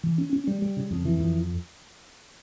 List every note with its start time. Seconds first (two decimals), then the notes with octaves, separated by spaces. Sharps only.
0.03 E3
0.18 C#4
0.33 C#4
0.47 G3
0.62 G3
0.77 C#3
0.91 F2
1.05 E3
1.20 F2